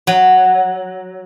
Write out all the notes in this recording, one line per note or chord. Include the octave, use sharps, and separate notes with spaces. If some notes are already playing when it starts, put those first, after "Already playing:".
F#3